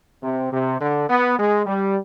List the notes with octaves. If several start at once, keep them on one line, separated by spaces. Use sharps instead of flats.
C3
C3
D3
B3
G#3
G3